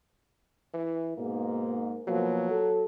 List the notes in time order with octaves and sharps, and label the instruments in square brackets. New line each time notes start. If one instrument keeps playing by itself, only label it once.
[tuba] E3
[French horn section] G#2 A#3 [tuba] B2
[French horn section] B2 F3 A#3 [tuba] F#3
[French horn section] A4